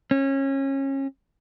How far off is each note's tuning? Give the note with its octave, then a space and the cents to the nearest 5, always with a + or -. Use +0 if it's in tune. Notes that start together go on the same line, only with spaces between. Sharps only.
C#4 -25